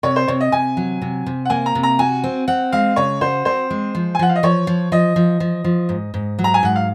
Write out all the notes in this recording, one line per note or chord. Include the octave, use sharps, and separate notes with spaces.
C3 C#5
C5
C3 C#5
D#5
C3 G#5
F#3
C3
C3
F#5
A#3 G#5
A#5
C3
A#5
F#4 G#5
C4
C4 F#5
G#3 F5
C#3 C#5
F#4 C5
C4 C5
G#3
F3
G#5
F3 F#5
F5
D#5
F3 C#5
F3
F3 D#5
F3
F3
F3
G#2
G#2
F#3
A#5
G#5
G#2 F#5
F5